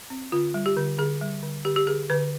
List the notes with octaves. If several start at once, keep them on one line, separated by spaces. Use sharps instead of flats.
C4
D3 F4
G3
G4
D3
D3 G#4
G3
D3
D3 G4
G4
D3 G#4
D3 B4